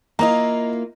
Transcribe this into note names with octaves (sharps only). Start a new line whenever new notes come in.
A#3 E4 F4 D#5 A#5